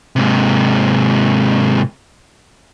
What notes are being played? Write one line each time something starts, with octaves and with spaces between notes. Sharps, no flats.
G#2 C3